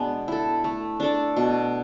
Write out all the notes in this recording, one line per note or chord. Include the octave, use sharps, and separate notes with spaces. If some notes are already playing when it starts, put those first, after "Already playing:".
Already playing: B2 G#3 B3 D4
E4 A4
A3
D4 A4 D5
B2